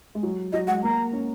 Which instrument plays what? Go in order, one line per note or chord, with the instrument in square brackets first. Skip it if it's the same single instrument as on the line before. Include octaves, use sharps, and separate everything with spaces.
[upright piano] G#3
F#3
[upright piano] F#3 [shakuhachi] D#5
[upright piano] G#3 [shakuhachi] F#5
[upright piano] A#3 [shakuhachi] A#5
[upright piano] C#4